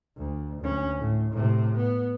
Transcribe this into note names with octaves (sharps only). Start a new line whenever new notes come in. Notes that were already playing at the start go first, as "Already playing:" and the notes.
D2
D2 C#4
A2
A2 C3
B3